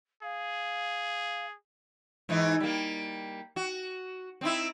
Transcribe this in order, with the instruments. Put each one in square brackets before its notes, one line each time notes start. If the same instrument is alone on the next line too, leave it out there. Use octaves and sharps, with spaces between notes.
[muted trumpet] G#4 [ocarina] F5
[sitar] G#2 E3 D#4
G3 A#3
F#4
C4 D#4 E4